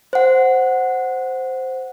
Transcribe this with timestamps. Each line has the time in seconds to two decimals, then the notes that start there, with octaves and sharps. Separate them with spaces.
0.13 C5 F#5